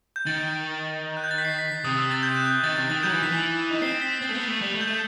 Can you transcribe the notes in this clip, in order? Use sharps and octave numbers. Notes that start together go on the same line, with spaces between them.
G6
D#3 A6
F#6
G6
A6
B6
C7
B6
B6
C3 D#6
E6
A6
G6
F#6
G6
D#3 A6
C3 A6
D#3 A6
F#3 G6
E3
D#3 B6
E3
D#4
C4 C7
B6
C4 A6
A3
B3
A6
A3
G3
A3
G6
A3